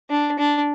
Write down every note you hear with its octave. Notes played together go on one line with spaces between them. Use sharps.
D4
D4